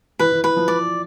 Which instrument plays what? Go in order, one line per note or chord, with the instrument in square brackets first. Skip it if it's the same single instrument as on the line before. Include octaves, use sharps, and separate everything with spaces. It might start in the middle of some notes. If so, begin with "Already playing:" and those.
[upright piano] E3 [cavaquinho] B4
[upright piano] E3
[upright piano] E3 [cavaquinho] B4
[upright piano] F3
[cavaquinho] D5